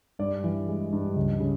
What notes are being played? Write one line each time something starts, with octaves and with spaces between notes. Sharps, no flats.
G2 D5
E3
G#3
G2
C#2
C#3